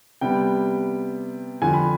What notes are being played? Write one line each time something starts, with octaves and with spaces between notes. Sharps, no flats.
C3 G3 B3 G5
F2 D3 F3 G#5
B5